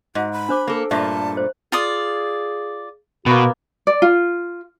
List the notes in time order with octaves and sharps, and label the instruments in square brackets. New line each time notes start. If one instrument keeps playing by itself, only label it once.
[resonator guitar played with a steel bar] G#2 [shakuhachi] F#4
[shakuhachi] B5
[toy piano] D4 C5 D6
[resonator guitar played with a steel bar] A#3 A4
[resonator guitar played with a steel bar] G2 A#2 A3 [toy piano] E5 [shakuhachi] A5
[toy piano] C5
[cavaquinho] F4 D5 D#6 [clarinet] G#4
[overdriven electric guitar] B2 [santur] A#3 B3 [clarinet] F#4
[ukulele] D5
F4